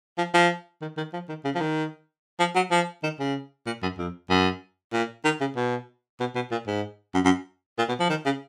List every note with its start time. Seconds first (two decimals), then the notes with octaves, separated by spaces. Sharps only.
0.18 F3
0.34 F3
0.81 D#3
0.97 D#3
1.13 F3
1.29 D#3
1.45 C#3
1.55 F3
1.60 D#3
2.39 F3
2.55 F#3
2.71 F3
3.03 D#3
3.19 C#3
3.66 A#2
3.82 F#2
3.98 F2
4.29 F#2
4.93 A#2
5.24 D#3
5.40 C#3
5.56 B2
6.20 B2
6.35 B2
6.51 A#2
6.67 G#2
7.14 F#2
7.25 F#2
7.78 A#2
7.88 B2
7.99 F3
8.09 D#3
8.25 C#3